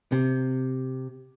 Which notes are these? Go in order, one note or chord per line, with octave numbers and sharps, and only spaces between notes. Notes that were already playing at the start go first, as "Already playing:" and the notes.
C3